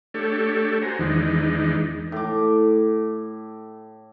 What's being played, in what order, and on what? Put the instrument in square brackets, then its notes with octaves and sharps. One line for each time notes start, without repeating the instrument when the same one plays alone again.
[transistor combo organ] A3 D4 G4 A4 C#5
F#4 C5 G#5 A#5
E2 D#3 E3 G#3 D4 D#4
[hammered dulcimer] A2 D6